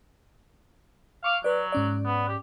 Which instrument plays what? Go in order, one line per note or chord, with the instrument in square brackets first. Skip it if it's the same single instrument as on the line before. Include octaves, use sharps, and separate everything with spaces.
[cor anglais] F5 [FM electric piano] C#6 D6
[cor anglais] F#3 [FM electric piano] B4 D5
[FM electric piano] G#2 C#4 D5
[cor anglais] B3
G4